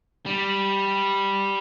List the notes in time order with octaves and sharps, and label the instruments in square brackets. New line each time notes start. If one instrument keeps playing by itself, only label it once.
[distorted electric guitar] G3